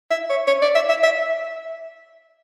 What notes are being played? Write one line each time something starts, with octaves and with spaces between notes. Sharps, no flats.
E5
C#5
C#5
D5
E5
E5
E5